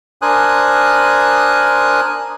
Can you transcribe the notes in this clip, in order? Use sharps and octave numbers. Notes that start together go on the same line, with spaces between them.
D4 A#4 C5 G#5 D#6 F#6